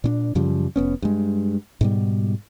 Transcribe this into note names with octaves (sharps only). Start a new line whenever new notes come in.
A#2 C#4 D4
F#2 C#3 F3 G3
F1 B3 C#4
G2 G#3
G#2 B2 G3